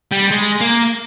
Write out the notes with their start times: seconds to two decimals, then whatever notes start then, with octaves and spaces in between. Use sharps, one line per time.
0.12 G3
0.31 G#3
0.61 A#3